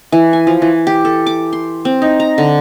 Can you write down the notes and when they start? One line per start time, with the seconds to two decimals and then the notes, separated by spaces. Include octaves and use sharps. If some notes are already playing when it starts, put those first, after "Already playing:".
0.12 E3
0.33 G#5
0.47 F3
0.62 E3
0.87 G4
1.05 A4
1.27 D6
1.53 C6
1.85 C4
2.02 D#4
2.20 A#5
2.38 D3